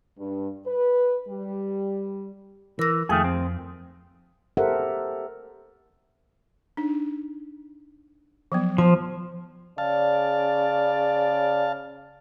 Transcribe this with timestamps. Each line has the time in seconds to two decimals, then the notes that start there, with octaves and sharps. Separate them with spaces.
0.18 G2
0.66 B4
1.29 G3
2.79 E3 A#4 A#6
3.09 F2 D#3 F3 A3 G#4 G5
3.24 C4
4.57 G4 A4 A#4 C5 E5 F#5
6.77 D4 D#4
8.52 F3 F#3 B3
8.78 F3 C6
9.78 C#3 D5 F5 A5